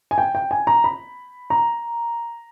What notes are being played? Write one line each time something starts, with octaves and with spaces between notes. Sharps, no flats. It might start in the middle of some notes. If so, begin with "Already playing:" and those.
G#5
G5
G5
G#5
A#5
B5
A#5